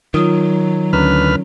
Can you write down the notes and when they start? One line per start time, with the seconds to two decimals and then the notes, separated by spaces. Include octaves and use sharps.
0.14 D#3 F#3 F4 D#6
0.93 D2 C#4 B4 A#5 F6